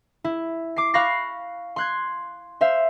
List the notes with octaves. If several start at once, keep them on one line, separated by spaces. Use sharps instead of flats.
E4
D6 C7
F5 B5 C#6 F#6 A#6 C7
C6 F#6 G#6
C5 E5 F5